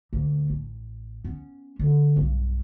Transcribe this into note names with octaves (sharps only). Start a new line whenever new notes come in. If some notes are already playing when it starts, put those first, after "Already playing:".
D2 A#2
A1
B3 C#4
D3
B1 G2